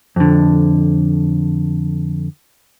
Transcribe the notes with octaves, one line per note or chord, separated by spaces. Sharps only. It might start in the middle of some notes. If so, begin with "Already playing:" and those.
F2 D3